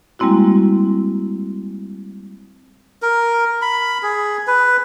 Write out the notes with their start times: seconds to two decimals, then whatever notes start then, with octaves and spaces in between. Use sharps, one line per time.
0.19 G3 G#3 A#3 C4 E4 F#4
3.02 A#4
3.62 B5
4.03 G#4
4.47 B4